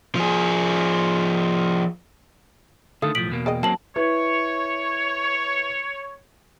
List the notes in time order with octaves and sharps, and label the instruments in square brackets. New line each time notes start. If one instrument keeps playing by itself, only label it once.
[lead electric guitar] F3 G#4
[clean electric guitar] D3 D#3 A3 [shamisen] A4 F5 [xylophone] D#6
[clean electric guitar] B1 A2 F3 [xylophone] B6 D7 F#7
[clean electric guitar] E2 B2 A#3
[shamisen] G#4 D5 D#5 [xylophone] G5
[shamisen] D#3 C#4 [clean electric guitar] F#3 A#3 C4 [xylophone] A5 F#7
[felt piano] E4 B4 [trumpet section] C#5